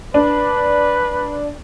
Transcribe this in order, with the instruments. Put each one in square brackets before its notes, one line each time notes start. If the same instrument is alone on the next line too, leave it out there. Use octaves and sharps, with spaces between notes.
[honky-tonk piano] D4 [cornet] B4